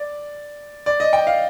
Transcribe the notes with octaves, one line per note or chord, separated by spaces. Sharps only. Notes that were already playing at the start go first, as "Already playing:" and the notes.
Already playing: D5
D5
D#5
G5
F5